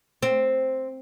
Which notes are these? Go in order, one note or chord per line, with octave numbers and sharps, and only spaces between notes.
C4